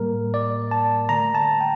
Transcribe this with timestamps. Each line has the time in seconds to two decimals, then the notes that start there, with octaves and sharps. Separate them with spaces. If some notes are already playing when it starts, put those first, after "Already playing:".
Already playing: A2 G3 A#3 A#4
0.34 D5
0.71 A5
1.09 D3 A3 A#5
1.35 A5
1.60 G5